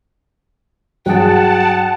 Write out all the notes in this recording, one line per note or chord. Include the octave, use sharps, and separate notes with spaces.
G2 F#3 G#4 F#5 G5 A5